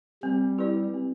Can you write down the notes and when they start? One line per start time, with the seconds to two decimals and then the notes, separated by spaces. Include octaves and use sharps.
0.23 G3 C4
0.58 E4 G4 B4 D5
0.94 C4